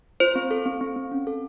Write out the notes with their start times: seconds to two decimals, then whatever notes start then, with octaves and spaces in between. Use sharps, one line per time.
0.20 F4 C5
0.35 C4
0.51 A4
0.66 C4
0.81 C4
0.96 C4
1.12 C#4
1.27 A4